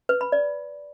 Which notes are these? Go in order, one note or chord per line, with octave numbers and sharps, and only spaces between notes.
B4
B5
D5